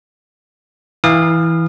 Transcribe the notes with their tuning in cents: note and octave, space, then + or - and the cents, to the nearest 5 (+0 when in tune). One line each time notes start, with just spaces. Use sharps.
E3 -5 F5 +0 D#6 -35